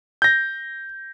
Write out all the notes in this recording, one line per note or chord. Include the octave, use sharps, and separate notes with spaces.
G6 A#6